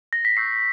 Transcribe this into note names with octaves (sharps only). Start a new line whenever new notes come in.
A#6
B6
C#6 E6 G6 C7